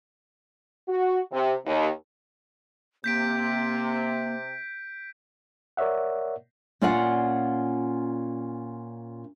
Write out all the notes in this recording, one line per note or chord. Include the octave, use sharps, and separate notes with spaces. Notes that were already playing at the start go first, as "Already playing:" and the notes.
F#4
C3
D#2
C3 A#3 G6 B6 D7
A#4 C#5 D5 E5 F#5
A#2 C#4 F4 D5 F5 F#5